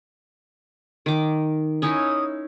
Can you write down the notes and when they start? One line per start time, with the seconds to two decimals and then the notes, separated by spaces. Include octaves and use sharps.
1.06 D#3 D6
1.82 C#4 D#4 E4 D#6